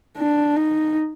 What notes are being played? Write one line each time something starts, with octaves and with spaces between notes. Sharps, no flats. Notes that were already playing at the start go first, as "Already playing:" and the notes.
D4
D#4